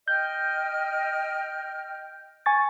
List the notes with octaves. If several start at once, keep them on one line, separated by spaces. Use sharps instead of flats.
D#5 G5 F6 G6
G#5 C#6 A6